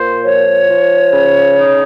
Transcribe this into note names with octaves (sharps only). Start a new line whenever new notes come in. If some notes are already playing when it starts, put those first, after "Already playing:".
Already playing: A#2 C5
F3 C#5
F3
C#3
D#4